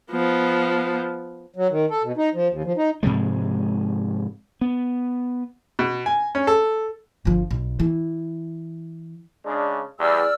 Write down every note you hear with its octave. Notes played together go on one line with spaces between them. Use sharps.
F3 B3
F#3
D#3
A4
B2
D#4
F3
D#2
F3
D#4
G#2 C3 F3 G#3
B3
B2
G#5
C#4
A4
G1 F3
B1
E3
C#3 G#3 D4
E2 G3 D5 E6 F6